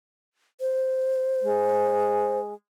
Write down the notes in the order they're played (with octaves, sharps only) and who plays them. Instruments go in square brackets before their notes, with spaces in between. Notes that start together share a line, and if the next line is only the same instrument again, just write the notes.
[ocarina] C5
[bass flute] G#3